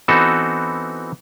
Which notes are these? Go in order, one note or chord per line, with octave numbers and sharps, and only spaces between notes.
E3 B3 C4 D#4 F#4 A4